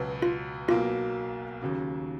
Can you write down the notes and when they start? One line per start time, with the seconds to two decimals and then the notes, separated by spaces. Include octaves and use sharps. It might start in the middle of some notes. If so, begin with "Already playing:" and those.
Already playing: C#2 B2 F#3 B3
0.22 F4
0.68 B1 B2 F#3 A#3 F4
1.61 D#2 C#3 F#3